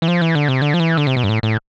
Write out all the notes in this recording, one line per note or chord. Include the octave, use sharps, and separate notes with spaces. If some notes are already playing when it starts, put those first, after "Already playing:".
E3
F3
E3
D3
C3
D3
F3
E3
D3
C3
B2
G2
A2
A2